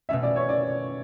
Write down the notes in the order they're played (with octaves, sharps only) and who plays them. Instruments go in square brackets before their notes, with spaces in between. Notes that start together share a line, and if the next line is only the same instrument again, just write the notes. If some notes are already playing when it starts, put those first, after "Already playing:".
[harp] B2 A3 C#4 [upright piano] E5
[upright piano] D5
C#5
D5